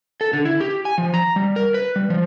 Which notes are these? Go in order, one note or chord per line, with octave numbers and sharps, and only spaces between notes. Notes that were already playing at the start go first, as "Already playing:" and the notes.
A4
D3
E4
G4
G#5
F3
A#5
G3
A#4
B4
G3
F3